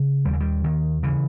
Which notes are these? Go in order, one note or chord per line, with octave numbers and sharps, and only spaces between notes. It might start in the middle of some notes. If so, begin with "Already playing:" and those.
Already playing: C#3
D#2 G3
E3
D#3 G3
D#2 D#3
C#3 E3